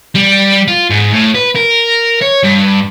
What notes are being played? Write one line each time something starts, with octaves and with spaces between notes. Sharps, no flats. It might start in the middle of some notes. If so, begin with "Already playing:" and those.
G3
F4
G#2
A2
B4
A#4
C#5
G2